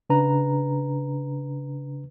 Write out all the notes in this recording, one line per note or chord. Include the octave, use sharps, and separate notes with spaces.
C#3 D4 B4 A#5